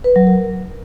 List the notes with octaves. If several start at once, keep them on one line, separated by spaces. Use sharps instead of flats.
B4
F#3
A#4